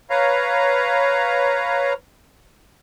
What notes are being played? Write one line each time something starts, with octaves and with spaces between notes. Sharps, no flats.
B4 C#5 F5 A#5